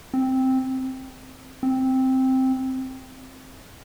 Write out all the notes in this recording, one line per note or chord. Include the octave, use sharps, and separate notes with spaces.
C4
C4